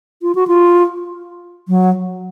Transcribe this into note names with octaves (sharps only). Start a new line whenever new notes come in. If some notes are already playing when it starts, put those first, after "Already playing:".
F4
F#4
F4
F#3